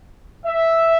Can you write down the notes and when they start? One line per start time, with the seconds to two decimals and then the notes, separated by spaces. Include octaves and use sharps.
0.46 E5